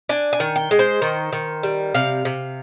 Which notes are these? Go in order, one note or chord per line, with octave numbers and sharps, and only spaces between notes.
D4 G#5
G#5
D#3
G5
G#3
C5
D#3
D#3
G3
C3 F5
C3